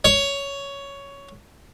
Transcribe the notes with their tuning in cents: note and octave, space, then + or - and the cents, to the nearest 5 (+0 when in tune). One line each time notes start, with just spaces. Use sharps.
C#5 +10